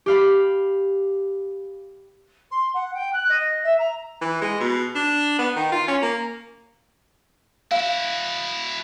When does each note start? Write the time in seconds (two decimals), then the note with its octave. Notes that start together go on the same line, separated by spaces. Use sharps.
0.06 G4 F5 B5
2.51 C6
2.74 F#5
2.94 G5
3.13 F#6
3.29 D#5
3.63 E5
3.79 A#5
4.22 E3
4.41 G#3
4.60 B2
4.95 D4
5.39 B3
5.56 D#3
5.72 F4
5.88 C#4
6.02 A#3
7.72 E4 F#4 F5